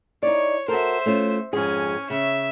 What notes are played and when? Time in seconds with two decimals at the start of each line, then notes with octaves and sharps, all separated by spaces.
0.23 D#4 E4 C#5 D5
0.68 F#4 A4 A#4 C5 E5
1.06 A3 C#4 F4
1.53 F2 G#2 C#4 G#4 G#5
2.10 C#3 E5